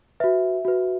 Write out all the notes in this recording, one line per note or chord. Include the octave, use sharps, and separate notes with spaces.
F#4 B4 E5
F#4 B4